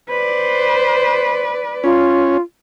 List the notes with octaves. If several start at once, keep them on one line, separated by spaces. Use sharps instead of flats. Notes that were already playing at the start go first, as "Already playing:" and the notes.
B4 C5 D5
C#4 F4